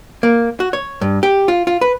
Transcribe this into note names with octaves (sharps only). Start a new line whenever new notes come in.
A#3
F#4
C#5
G2
G4
F4
F4
B4